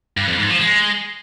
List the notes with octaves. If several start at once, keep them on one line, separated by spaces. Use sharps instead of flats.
G2
F2
G#2
F3
G#3